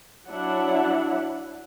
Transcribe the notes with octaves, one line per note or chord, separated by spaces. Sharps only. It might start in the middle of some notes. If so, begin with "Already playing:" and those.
F#3 D4 E4 E5 F#5